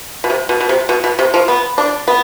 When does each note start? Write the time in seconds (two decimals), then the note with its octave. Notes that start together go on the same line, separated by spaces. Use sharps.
0.24 B2
0.30 C3
0.49 B2
0.60 B2
0.69 C3
0.89 B2
1.04 B2
1.19 C3
1.34 F3
1.48 B3
1.78 D4
2.08 B3